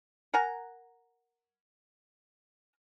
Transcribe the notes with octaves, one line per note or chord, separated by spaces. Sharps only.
A#4 F#5 G#5 A#5